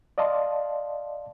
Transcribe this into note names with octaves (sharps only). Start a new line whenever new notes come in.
D5 D#5 F5 A5 C6